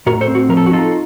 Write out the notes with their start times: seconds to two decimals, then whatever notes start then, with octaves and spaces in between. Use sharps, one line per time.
0.06 A2 F#4 A#4
0.21 A4 C5
0.27 C4
0.35 F#4
0.49 F3 A#4
0.57 A4
0.66 F#4
0.71 D#4 F4 A4